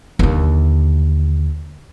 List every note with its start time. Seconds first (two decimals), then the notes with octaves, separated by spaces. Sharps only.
0.19 D#2 D3